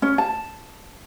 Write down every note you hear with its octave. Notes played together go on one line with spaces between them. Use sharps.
C#4
A5